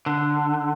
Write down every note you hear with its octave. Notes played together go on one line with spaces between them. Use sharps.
D3